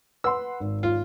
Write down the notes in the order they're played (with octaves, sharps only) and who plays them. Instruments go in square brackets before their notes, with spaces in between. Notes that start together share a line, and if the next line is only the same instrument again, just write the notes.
[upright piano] B4 F#5 C6 [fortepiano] E6
[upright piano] G#1
[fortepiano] F4